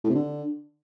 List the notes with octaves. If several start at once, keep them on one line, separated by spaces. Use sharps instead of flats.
A2
C3
D3